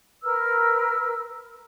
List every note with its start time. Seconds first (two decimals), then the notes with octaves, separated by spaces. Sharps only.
0.23 A#4 B4 E6 F6